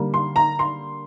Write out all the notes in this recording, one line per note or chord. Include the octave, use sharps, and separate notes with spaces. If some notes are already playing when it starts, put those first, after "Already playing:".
Already playing: D3 G3 A#3
C6
A#5
C6